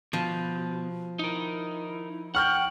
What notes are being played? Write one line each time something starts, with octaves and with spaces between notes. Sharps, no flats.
B2 F3
D#4 E4 A#4
F#5 G5 C#6 F6 G6